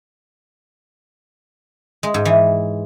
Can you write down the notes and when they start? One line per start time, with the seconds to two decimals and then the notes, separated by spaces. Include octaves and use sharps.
2.03 G#3
2.14 G#2
2.25 E3